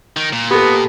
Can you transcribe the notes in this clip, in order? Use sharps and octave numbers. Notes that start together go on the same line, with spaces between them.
D#3
A#2
B3 G4 A4